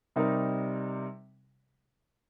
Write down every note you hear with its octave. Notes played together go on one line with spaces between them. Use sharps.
C3 G3 D#4 A#4